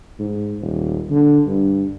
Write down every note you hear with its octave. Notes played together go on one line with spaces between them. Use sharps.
G#2
D#1
D3
G2